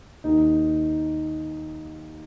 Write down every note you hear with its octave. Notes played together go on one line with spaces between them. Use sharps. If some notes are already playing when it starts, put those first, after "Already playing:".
D#2 D#3 D#4